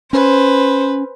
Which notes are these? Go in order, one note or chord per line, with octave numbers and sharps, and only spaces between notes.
C#4 B4 C5